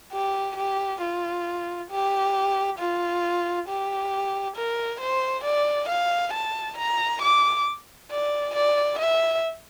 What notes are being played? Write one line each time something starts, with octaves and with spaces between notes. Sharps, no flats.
G4
G4
F4
G4
F4
G4
A#4
C5
D5
F5
A5
A#5
D6
D5
D5
E5